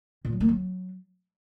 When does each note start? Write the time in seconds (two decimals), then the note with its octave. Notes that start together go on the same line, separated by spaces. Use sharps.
0.25 A#2
0.32 F#3
0.40 A#3
0.48 F#3